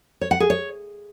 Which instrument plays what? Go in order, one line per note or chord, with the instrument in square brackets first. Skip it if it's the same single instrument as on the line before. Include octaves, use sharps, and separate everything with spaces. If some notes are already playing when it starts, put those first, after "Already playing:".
[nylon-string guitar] C#5
F#5
G#4
C#5